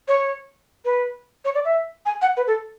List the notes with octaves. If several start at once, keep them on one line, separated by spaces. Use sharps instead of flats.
C#5
B4
C#5
D5
E5
G#5
F#5
B4
A4